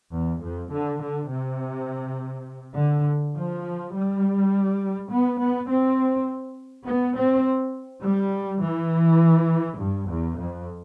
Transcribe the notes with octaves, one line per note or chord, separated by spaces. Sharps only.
E2
F2
D3
D3
C3
D3
F3
G3
B3
B3
C4
B3
C4
G3
E3
G2
E2
F2